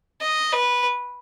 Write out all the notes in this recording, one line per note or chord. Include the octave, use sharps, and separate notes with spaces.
D#5
B4